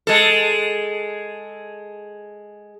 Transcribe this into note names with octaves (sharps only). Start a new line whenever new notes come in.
G#3 A4